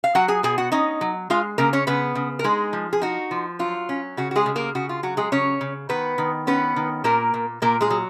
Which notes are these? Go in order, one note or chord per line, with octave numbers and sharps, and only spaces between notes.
F5
F#3 F#4 F#5
G#4 G#5
B2 G#4 G#5
F#4 F#5
C#4 D#4 D#5
F#3
G#3 F4 F5
C#3 A#3 A#4
C#4 C#5
C#3 B3 B4
C#3
A#4
G#3 D#4 G#4
F3
G#4
D#4 F#4
F3
F#3 F4
C#4
C#3 F#4
F#4
G#3 G#4
C#3
A#3 A#4
C#3 F#4
F4
F#3 F#4
G#3 G#4
C#3 C#4 C#5
C#3
D#3 B3 B4
D#3
B3 C#4 B4
D#3
A#2 A#3 A#4
A#2
A#2 A#3 A#4
G#3 G#4
F#3